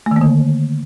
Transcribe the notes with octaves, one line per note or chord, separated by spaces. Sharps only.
A3
D#3
A#3
D3